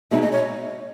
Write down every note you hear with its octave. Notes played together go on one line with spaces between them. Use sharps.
B2 G#3 D#4 E5
D#5
C#5